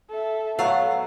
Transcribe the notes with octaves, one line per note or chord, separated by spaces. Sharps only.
A4 E5
F#3 A3 B3 F5 F#5